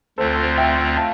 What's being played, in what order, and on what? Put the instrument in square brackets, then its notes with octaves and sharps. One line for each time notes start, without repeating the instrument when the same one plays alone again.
[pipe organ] D2 D3 A3 C4 F4 [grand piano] A4 C5
[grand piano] E5 G5
F5 A5